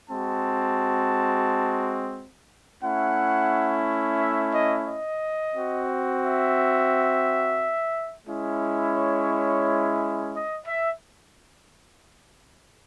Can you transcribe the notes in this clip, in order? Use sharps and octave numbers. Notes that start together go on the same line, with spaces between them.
G#3 C4 F#4 A5
A3 C#4 E4 F#5
E5
D#5
D#5
C4 F#4
E5
G#3 C#4 E4
C#5
D#5
E5